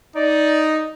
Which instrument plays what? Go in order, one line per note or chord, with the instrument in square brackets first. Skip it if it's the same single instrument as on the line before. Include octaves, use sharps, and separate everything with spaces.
[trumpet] D#4 [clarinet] D5